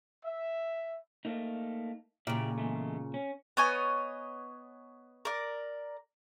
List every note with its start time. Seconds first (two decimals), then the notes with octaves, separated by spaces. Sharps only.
0.25 E5
1.25 A3 A#3 D#4
2.27 A#2 C#3 E4 G4 D5
2.58 E2 G#3 A3
3.14 C#4
3.57 B3 C#5 D#5 G#5
5.25 A#4 D5